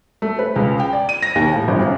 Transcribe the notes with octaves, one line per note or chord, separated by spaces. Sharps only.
A3
B4
C#2
G5
D5
D#7
A#6
D#2
A2
G1
F#2